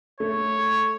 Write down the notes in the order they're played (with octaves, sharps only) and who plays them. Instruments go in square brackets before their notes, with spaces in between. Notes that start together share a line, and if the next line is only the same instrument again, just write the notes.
[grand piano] A3 [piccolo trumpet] C#5